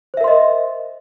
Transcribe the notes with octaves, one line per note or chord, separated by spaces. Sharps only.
A#4 C5 D#5 E5 C6